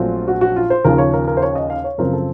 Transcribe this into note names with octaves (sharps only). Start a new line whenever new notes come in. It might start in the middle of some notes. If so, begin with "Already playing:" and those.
Already playing: A#1 A#2 F#3 A3 C4 F4
F#4
F#4
F4
C5
D#2 C#3 F3 A#4
C#5
A#4
A#4
C5
C#5
D#5
F5
C#5
F#2 C#3 F3 C4 A#4
A4